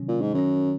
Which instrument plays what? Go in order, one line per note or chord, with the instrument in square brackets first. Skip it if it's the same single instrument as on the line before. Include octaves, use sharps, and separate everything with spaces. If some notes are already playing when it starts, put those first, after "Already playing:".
Already playing: [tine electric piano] C3 D#3 F#3 C#4
[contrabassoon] A#2
G#2
[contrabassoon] F#2 [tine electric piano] D#3 F#3 C#4